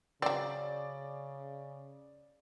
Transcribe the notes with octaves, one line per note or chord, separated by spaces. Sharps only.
C#3 F#3 C4 D5